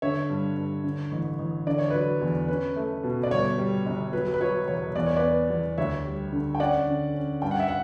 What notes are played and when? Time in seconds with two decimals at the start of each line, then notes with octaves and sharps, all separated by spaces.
0.02 D3 C#5 E5
0.29 G2
0.57 G2
0.84 D3
1.12 A1
1.39 A1
1.66 D3 D5
1.78 C#5
1.90 F#3 B4 D5
2.21 E2
2.48 C#4 B4
2.76 A3
3.04 B2
3.23 D5
3.31 G1 C#5
3.58 G3
3.86 G1
4.13 F#3 B4
4.34 B4
4.41 F#3 C#5
4.68 E1 C#5
4.95 E2 D5
5.06 C#5
5.17 B4 D5
5.23 B3
5.50 E2
5.78 D2 C#5 E5
6.05 G3
6.32 D3
6.55 G5
6.60 C#4 D5 F#5
6.87 D3
7.14 C#4
7.42 G2 G5
7.51 F#5
7.60 E5
7.68 F#5